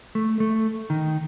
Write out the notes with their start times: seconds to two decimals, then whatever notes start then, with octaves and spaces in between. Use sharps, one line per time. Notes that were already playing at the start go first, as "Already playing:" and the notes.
0.15 A3
0.40 A3
0.90 D#3